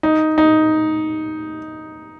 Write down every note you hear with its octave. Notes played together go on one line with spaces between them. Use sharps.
D#4
D#4